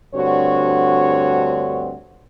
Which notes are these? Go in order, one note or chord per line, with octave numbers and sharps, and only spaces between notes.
D2 G2 D3 C4 F#4 C#5